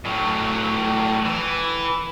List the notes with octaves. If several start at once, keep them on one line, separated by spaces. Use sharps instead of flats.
A2 F#3
E3